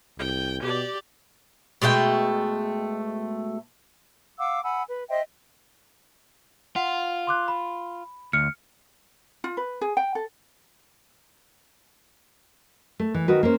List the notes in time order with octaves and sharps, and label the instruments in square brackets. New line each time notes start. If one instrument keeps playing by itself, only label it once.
[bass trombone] C2 [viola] G5
[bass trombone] B2 [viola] G4 D5
[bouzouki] B2 G#3 A3 G5
[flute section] F5 F#5 D6 E6
F#5 G#5 B5 E6
B4
C5 D#5 E5 G5
[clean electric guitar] F4 [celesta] F#5
[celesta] C6 D6 F#6
B5
[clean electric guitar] D2 [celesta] F6 C#7
[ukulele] F4
B4
G#4
G5
A4
[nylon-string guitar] A3
E3
D#3 F#4 B4
A#3 C#4 C5